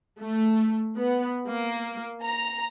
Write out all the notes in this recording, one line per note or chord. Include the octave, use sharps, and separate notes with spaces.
A3
B3
A#3
A#5